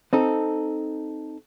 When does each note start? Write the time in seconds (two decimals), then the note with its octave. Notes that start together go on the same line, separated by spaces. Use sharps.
0.13 C4 D#4 A4